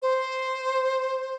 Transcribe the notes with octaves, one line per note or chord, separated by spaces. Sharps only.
C5